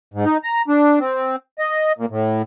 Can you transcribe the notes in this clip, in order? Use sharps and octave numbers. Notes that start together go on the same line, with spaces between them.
G#2
D#4
A#5
D4
C4
D#5
A#2
A2